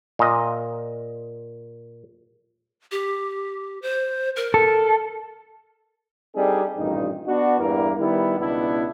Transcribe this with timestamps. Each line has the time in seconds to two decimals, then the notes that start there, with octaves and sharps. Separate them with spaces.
0.19 A#2 D#5
2.92 G4
3.82 C5
4.36 A#4
4.54 A4
6.35 G3 C4 D4 D#4 G#4 A4
6.76 A1 G2 A#2 D#3 D#4
7.27 B3 D4 F#4
7.58 E2 G2 E3 A#3 D4 A#4
7.97 D#3 G3 B3 E4
8.38 C#2 B2 B3 D4 E4